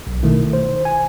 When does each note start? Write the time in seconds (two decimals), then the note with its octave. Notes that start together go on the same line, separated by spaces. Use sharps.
0.07 B1 F#3
0.23 B2 D#3 A3 E4
0.53 C5
0.85 G#5